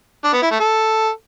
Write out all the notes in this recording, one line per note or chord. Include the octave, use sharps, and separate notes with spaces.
D4
B3
E4
A3
A4